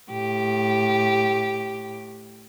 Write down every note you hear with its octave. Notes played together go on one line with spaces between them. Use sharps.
A2 G4